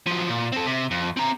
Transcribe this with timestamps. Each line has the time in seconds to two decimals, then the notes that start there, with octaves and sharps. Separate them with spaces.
0.07 F3 F#3
0.29 A#2
0.52 C4 A4
0.66 C3
0.91 F2
1.17 C4 A#5